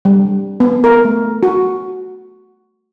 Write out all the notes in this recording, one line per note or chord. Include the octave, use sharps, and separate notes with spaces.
G3
B3
A#4
A3
F#4